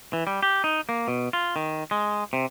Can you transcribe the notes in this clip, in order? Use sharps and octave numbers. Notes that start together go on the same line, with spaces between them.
E3
G3
G4
D#4
A#3
B2
F4
D#3
G#3
C3